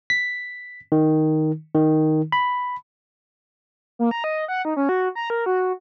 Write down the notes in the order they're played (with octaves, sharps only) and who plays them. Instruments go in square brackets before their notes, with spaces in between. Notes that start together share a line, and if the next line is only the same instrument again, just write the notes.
[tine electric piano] B6
D#3
D#3
B5
[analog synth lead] A#3
A#5
D#5
F#5
D#4
C#4
F#4
A#5
A#4
F#4